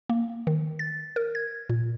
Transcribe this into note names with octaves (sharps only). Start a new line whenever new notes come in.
A#3
D#3
A6
A#4
G#6
A#2